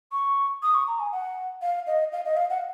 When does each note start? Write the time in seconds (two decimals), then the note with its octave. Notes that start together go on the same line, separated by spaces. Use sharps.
0.12 C#6
0.63 D#6
0.74 C#6
0.88 A#5
1.00 G#5
1.12 F#5
1.62 F5
1.87 D#5
2.12 F5
2.25 D#5
2.37 F5
2.50 F#5